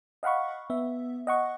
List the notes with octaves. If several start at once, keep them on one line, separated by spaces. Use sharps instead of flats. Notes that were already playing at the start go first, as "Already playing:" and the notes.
D#5 F5 F#5 B5 C#6
B3 E5
D#5 F#5 C#6